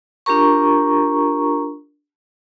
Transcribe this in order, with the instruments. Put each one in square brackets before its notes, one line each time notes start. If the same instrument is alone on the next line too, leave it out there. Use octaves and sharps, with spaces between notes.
[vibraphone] D4 F4 G4 A#4 A#5 C#6